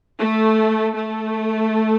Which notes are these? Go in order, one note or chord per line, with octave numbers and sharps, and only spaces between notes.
A3
A3